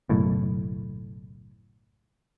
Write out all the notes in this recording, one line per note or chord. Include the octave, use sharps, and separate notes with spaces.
F#1 B1 A2